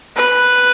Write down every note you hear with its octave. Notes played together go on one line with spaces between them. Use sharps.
B4